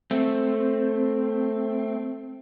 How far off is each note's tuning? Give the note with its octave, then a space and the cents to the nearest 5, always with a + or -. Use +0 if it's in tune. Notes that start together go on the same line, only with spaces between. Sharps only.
A3 +0 C4 +5